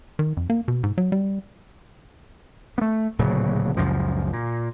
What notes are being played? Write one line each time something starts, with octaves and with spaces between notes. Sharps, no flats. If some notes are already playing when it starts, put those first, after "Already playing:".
D#3
F2
A#3
B2
G#2
F#3
G3
A3 B3
D1 A#2 C#3 F#3
C#2 F#2 A#2 F3
A#2